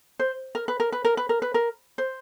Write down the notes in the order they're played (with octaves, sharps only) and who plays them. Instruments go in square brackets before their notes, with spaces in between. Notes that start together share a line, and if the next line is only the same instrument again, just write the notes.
[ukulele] C5
A#4
B4
A#4
B4
A#4
B4
A#4
B4
A#4
C5